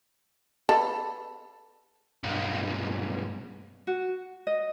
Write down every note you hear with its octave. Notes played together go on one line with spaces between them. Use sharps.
A4 B4
B1 G2
F#4
D#5